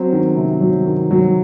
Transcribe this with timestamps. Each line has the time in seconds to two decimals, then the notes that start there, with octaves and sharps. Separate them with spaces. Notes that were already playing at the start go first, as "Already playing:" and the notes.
Already playing: F#3 C4
0.13 D#3
0.36 C3
0.61 F#3
0.86 D#3
1.11 F#3